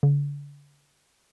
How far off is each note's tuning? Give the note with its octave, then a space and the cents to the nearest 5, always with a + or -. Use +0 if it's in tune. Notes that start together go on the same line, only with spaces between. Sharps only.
D3 -40